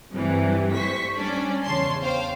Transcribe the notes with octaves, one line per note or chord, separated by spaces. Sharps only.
G2 C3 E3
C5 C#6 B6
G3 C#4 D4 D5
E2 C#3 C#5 A5 C6 C7
C5 F5 G5